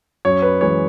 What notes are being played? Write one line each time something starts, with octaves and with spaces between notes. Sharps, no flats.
F#2 C#5
B4
E3 G#3 C#5